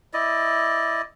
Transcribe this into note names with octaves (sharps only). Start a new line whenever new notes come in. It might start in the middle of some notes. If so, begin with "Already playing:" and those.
E4 D5 D#5